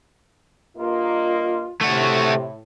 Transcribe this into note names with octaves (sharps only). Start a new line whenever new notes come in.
G2 A#3 F4 D#5
A2 C3 A3 F#4